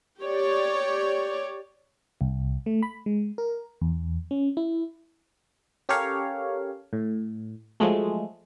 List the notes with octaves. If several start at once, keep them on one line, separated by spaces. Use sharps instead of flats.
G4 C#5 D5
C2
A3
B5
G#3
A#4
E2
C#4
E4
C#4 G4 A4 A#4 C#5 F5
A2
F3 F#3 G#3 A3